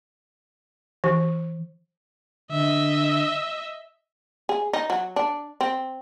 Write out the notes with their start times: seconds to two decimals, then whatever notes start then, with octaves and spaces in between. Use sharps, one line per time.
1.04 E3
2.51 D3 D#5 E5
4.49 G#4
4.73 D#4
4.90 F#3
5.16 D4
5.61 C4